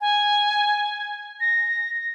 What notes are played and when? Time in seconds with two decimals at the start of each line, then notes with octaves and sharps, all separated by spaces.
0.01 G#5
1.40 A#6